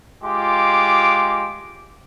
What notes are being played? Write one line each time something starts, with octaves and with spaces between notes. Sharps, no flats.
G#3 F4 G4 D6